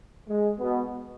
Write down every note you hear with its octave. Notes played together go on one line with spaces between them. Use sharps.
G#3
B2 B3